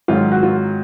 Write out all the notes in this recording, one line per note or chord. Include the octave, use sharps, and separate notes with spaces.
G#2 D#3 F#3 F4
F#4
F4